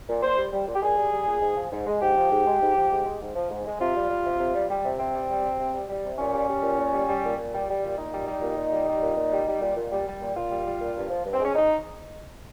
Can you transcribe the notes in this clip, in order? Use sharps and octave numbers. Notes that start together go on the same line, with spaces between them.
A#2
A#2 C5
G3
G3
A#2
G4
A#2 G#4
G3
G3
A#2
G#2
F3
G#2
G#3
G#2 G4
F3
G#2
G#3
G#2
F3
G#2
G#3
G#2
F3
G#2
G#3
C3 F4
G3
G3
C3
C3
G3
G3
C3
C3 C4
G3
G3
C3
C3
G3
G3
C3
A#2 C#4
G3
G3
A#2
A#2
G3
G3
A#2
A#2
G3
G3
A#2
A#2 D#4
G3
G3
A#2
A#2
G3
G3
A#2
A#2
G3
G3
A#2
A#2
G3
G3
A#2
A#2 F4
G3
G3
A#2
G2
F3
G2
C4
G#3 C#4
D#4